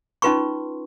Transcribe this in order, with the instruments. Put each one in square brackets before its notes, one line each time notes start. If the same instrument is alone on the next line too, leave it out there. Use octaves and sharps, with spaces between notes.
[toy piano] C#4 D#4 F4 B4 C6 C#6